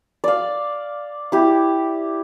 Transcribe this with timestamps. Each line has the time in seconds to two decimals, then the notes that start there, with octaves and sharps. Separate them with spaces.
0.24 D5 F5
1.32 E4 G4